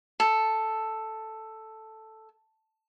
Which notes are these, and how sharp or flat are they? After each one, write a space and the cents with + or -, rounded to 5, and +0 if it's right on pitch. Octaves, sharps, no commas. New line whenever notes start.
A4 +0